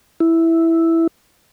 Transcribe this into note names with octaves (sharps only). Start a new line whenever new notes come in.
E4